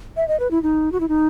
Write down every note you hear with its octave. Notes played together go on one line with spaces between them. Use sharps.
E5
D#5
B4
E4
D#4
F#4
E4
D#4